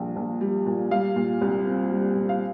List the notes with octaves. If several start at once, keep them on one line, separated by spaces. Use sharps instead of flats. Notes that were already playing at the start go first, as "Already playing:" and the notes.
Already playing: A#1 A#2 G3 G5
A#1
G3
A#2
G3 F5
A#2
C2
C4
G3
A#2
F5